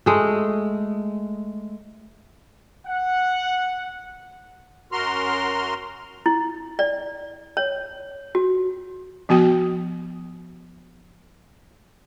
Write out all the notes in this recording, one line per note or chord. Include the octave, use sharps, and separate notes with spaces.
G#3 A3
F#5
F#2 F#4 A#4 C6 F6
E4
D5
C#5
F#4
F3 B3 F#4 G5